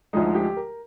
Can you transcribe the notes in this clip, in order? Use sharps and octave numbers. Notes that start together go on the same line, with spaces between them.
D2 D3 F3 G#3 D#4
G4
A#4